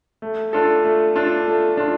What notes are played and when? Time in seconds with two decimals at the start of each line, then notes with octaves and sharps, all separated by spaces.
0.22 A3
0.53 D4 F4 A4
0.84 A3
1.16 D4 F4 A4
1.47 A3
1.77 D4 F4